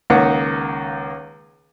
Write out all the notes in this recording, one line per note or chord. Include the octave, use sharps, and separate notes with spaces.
C#2 D#3 A#3 F#5